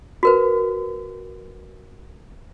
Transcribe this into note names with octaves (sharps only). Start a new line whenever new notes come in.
F#4 A#4 B4